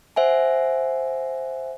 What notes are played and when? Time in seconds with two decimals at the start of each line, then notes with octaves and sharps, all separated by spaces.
0.16 C5 E5 F#5 G#5